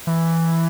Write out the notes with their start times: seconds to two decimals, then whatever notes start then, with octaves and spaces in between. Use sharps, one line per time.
0.07 E3